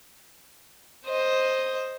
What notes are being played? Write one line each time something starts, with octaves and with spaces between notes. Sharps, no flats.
C5 D#5